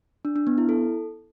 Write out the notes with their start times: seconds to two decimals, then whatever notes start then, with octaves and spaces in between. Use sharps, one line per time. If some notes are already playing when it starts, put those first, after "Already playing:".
0.25 D4
0.36 D4
0.47 B3
0.58 E4
0.69 A4